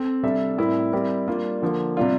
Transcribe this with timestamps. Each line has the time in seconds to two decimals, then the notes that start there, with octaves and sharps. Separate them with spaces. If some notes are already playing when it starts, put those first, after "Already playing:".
Already playing: C4 A4
0.23 C3 G3 D4 A4 E5
0.58 A2 G3 C4 E4 A#4
0.92 G3 C4 E4 G4 A#4
1.28 G3 A#3 D4 F4
1.62 D3 F3 A#3
1.97 C3 G3 D4 F4